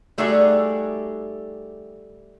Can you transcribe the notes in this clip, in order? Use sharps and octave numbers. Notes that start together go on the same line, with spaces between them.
G3 A3 D#4 F#4 G#4 D5